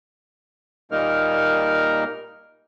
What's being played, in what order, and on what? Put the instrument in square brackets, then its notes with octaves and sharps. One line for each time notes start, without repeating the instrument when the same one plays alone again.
[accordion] A#2 G3 A#3 D#4 A#4 F6